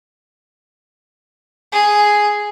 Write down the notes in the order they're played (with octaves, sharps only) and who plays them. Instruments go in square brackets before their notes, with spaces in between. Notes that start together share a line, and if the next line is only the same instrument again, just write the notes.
[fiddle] G#4